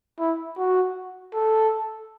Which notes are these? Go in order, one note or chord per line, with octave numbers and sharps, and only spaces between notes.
E4
F#4
A4